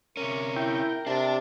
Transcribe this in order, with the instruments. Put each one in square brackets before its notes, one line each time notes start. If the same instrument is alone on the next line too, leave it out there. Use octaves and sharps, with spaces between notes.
[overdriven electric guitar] C3 C#4 [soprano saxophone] A#4
[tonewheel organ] E4 G5
[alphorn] C3 [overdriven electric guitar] D4 D5 [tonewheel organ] A5